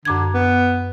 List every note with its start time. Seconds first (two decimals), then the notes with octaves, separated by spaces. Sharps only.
0.05 F#2 D3 D6 G#6
0.34 B3